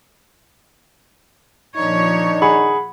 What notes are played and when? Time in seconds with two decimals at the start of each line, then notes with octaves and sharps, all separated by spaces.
1.77 A#2 D#3 F3 D4 D#4 C#5
2.42 G#4 F#5 B5